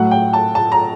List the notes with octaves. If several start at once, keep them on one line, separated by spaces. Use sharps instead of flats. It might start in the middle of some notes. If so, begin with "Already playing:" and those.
Already playing: A2 F#3 A3 F#5
G5
A5
A5
A#5